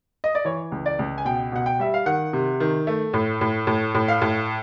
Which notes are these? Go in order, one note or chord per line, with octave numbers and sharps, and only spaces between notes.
D#5
D5
E3 C#5
C#2
D5
C#2
G#5
B2 G5
B2 F#5
G5
G3 E5
F5
D#3 F#5
C3
D#3
A3
A2
A2
A2
A2
F5
A2